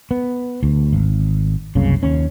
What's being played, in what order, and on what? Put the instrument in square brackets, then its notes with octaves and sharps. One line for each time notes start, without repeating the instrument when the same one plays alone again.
[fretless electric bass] B3
D2
G#1
F#1 C2 C#3
D#2 C#4